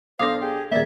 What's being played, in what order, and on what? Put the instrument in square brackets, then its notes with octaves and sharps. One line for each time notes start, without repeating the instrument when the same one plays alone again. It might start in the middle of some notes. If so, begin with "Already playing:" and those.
[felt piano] B1 D4 A#6 [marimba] A4 D6 D#6 [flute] C5 [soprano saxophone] F5
[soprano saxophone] G4 [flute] G#4
[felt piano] D#1 A#3 [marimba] D#3 G#4 [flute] D5 [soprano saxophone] E5